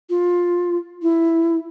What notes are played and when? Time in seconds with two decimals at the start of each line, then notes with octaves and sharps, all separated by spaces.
0.09 F4
1.02 E4